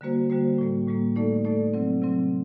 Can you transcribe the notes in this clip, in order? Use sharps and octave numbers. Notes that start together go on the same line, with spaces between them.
D3 G3 A#3 F#4 C5
D3 G3 A#3 F#4 C5
A2 G3 A#3
A2 G3 A#3
A2 A3 D#4 A4 D5
A2 A3 D#4 A4 D5
C3 F#3 C4
C3 F#3 C4